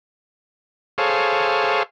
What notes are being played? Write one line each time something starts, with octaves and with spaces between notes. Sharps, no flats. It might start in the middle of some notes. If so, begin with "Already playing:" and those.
G#4 A4 C5 C#5 F5